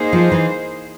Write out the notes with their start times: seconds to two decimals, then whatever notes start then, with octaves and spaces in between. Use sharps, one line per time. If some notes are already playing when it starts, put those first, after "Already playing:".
Already playing: A#3 D#4 G#4 C5
0.13 F3
0.32 E3